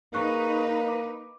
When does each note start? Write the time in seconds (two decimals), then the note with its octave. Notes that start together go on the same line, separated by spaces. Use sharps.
0.14 A#3 D#4 G#4 B4 C#6 F#6
0.88 D6